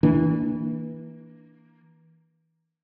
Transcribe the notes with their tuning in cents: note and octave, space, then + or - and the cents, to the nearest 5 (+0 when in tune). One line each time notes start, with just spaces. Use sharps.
E3 -25 A#3 +0 D4 +0